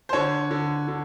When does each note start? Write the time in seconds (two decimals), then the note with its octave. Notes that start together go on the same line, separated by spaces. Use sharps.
0.09 C5
0.13 D3 C#5
0.51 D3
0.88 D3